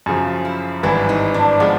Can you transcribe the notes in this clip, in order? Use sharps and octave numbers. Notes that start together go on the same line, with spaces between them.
F#2 C#3 F3
E4
G#1 G2 E3 E4
D#4
D4
F3 G#3 B3